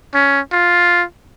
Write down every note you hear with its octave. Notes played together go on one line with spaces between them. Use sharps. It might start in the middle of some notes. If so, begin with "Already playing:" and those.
C#4
F4